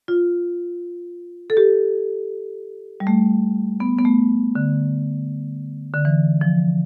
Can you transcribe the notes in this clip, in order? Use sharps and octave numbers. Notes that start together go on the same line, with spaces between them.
F4
A4
G4
G3
A3
B3
B3
A3
D3
D3
E3
F3